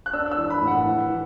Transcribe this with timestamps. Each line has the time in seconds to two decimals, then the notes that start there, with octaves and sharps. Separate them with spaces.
0.06 F#6
0.13 D4 E6
0.31 E6
0.38 E3
0.50 B5
0.62 A2
0.67 F#5
0.86 E3
1.10 E3